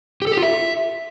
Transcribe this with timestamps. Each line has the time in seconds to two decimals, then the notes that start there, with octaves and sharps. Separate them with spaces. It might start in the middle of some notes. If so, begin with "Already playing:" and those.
0.22 G4
0.27 A4
0.32 G4
0.37 F4
0.42 E5